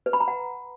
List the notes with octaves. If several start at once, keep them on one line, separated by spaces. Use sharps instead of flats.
B4
B5
A#5
F#5